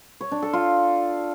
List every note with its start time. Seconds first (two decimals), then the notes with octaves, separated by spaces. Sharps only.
0.21 C#5
0.32 D4
0.42 A4
0.53 F4